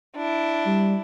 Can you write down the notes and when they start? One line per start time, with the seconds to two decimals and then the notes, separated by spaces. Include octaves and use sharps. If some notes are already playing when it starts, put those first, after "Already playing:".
0.16 D4 E4
0.66 G3